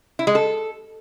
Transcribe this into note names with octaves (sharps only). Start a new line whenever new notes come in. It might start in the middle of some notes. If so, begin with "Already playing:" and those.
E4
G#3
A4